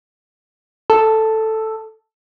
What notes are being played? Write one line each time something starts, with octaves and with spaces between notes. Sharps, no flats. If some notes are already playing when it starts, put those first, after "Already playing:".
A4